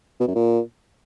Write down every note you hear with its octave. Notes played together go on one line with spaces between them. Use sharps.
B2
F#2
A#2